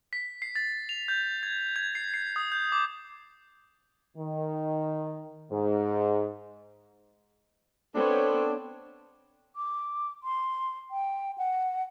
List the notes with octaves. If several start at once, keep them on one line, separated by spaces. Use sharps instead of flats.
B6
C7
A6
F7
G6
G#6
G#6
C7
C7
D#6
G6
D6
D#3
G#2
B3 C4 D4 A4 C5 C#5
D6
C6
G5
F#5